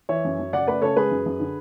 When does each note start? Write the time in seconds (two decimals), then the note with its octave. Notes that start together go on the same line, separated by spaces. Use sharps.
0.09 E3 C#5 E5
0.25 F#2
0.39 F#2
0.53 C#3 D5 F#5
0.67 A3 B4 D5
0.82 C#3 A4 C#5
0.96 G#3 G#4 B4
1.11 F#2
1.26 F#2
1.40 D3